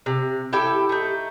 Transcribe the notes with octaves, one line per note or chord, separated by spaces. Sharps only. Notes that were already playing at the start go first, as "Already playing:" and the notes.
C3
E4 G4 A4 G5
A3 D#4